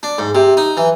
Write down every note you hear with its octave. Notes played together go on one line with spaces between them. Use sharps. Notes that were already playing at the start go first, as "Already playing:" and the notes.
D4
G#2
C3
D#4
E3